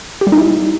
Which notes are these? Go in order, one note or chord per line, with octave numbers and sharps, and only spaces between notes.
G4
G3
D#4
E4